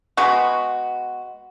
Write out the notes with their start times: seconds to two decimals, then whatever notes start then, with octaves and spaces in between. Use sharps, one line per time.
0.17 G#3 B3 F#4